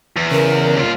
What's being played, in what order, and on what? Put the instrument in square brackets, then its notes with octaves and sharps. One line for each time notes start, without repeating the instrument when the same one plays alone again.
[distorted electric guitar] E2
[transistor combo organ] C#3 [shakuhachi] A#4
[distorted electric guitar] D#2 F4